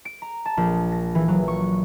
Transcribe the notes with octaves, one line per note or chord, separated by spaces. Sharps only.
D7
A#5
A5
A#1
A#6
E3
F#3
C#6